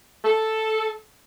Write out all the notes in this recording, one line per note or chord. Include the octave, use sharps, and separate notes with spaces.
A4